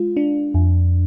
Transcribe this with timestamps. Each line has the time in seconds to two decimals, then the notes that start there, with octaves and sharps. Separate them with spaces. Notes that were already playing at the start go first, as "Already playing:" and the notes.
Already playing: G#3 F4
0.17 D4
0.54 F2